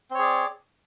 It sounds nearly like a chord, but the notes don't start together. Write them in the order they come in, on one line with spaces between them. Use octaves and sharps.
C4 C#5 G#4 D5